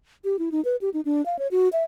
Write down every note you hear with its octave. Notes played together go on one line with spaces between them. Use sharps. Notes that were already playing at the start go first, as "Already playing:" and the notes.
G4
E4
D#4
B4
G4
D#4
D4
F5
C#5
F#4
E5